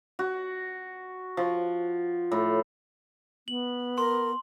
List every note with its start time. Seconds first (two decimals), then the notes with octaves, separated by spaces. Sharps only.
0.19 F#4
1.37 F3
2.32 A2
3.48 B3 F#7
3.98 A#4 C6